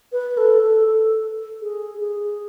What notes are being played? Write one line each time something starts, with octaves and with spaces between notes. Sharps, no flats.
B4
A4
A4
A4
G#4
G#4